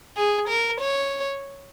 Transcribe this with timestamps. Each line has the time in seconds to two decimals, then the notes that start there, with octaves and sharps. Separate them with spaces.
0.17 G#4
0.48 A#4
0.80 C#5